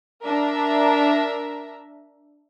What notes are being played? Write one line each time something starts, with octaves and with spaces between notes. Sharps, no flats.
D4 A#4 E5 A#5